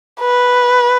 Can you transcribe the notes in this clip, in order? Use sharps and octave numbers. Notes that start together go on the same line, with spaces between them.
B4